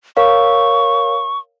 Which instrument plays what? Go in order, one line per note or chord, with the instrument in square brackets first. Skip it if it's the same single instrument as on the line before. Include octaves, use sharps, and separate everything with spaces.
[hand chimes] A#4 C#5 F5 [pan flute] C#6